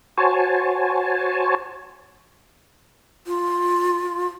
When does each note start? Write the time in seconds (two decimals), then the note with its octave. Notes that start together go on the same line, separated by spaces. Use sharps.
0.18 F#4 C5 C#5 G#5 A5
3.27 F4